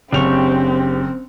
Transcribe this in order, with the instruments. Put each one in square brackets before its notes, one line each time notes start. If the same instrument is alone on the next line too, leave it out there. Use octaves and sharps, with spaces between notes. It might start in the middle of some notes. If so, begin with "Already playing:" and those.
[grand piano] F#1 F7 [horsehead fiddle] C4 [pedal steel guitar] D4 G4 C#6